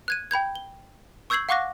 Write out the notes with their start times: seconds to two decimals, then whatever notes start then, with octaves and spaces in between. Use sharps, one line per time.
0.08 F#6 G#6 D#7
0.31 G5 B5 G6 G#6
0.55 G7
1.30 C#6 E6 G6 G#6 C7 F#7
1.49 F5 F#5 C#6 D6 F#6 A#6